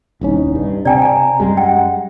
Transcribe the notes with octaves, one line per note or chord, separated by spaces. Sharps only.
D#1 C2 C#4 D#4
G2
C3 D5 G5 G#5 A#5
D5 G#5
F#2 G3 G#3
F#5 G5